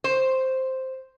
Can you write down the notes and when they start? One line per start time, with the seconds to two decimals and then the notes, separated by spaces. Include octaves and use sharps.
0.04 C5